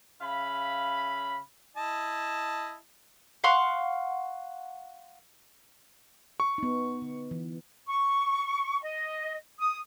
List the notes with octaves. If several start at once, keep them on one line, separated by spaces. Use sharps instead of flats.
C#3 E5 F5 B5
E4 D#5 A5
F5 F#5 C6 C#6
C#6
B3 D#4
D3
E3
C#6
D#5
D#6